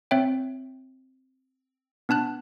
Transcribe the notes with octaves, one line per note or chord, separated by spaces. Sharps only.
C4 C#5 E5 G5
B3 D4 A5 F#6